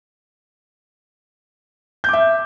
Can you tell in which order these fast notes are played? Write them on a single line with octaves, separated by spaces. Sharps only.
G6 D6 E5